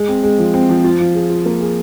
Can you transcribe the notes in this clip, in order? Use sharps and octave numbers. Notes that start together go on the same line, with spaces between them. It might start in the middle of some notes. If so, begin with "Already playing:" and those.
Already playing: G#3
C4
G#3
F3
C4
F3
F4
F3
G#4
F4
A#3
G#4